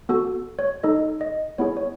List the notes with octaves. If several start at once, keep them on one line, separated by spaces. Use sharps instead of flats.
B3 F#4 A4
C#5
D#4 A4 D#5
D#5
B3 E4 G#4 C#5
C#5